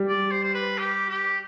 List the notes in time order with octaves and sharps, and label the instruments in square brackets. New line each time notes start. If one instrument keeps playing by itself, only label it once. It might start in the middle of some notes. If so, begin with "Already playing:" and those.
Already playing: [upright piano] G3
[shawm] D5
C5
C5
B4
G4
G4